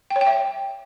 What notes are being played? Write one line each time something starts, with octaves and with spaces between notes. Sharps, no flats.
G5
C#5
G5
E5